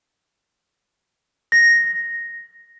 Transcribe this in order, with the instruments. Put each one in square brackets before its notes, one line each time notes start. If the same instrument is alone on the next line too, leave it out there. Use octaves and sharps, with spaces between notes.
[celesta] A#6